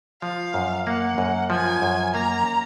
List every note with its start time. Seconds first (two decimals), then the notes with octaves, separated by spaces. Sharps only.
0.22 F3 F5
0.54 F#2
0.86 A#3 F#5
1.18 F#2
1.50 F3 G#5
1.82 F#2
2.14 A#3 A#5